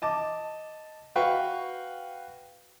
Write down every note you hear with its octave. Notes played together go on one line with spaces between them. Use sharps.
D#5 A5 D6
F#4 B4 F5 G5 C#6